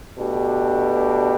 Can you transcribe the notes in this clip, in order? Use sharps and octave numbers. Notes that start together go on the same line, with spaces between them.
B2 A3 D4 G4